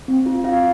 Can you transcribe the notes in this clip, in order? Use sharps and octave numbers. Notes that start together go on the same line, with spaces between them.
C4
F4
F4 F5